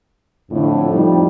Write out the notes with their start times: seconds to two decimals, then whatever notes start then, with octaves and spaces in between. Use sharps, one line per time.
0.51 F2 A2 D3
0.92 F3 G3 D#4